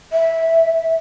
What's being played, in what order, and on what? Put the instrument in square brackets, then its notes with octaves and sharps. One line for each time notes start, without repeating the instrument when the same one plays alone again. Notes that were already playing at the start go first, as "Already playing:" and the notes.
[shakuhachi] E5